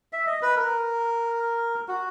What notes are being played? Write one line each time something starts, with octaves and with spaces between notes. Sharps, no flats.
E5
D#5
B4
A#4
F#4